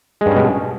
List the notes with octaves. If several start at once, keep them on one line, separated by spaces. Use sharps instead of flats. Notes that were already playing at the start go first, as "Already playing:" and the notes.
G2 B2 G#3 C#4